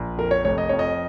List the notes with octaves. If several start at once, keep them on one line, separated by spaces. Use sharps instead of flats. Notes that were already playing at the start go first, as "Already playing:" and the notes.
Already playing: A#1
F2 A#4
C#5
F1 C#5
D#5
F2 C#5
D#5